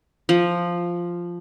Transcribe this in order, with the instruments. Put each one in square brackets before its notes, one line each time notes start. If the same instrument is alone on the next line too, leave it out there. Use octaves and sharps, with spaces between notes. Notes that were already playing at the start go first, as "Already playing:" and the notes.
[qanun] F3